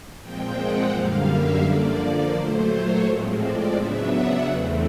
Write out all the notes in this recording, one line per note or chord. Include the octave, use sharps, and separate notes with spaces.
A#2 F3 G#3 C4 G5
F#5
F#2 D3 G3 A#3 F5
E5
D3 F3 A#3 D5
A#2 F#3 A3 C5
C#5
A2 F3 G#3 C4
D5
C#3 F#3 B3 D4 E5
F#5
E2 C#3 E3 A3 C4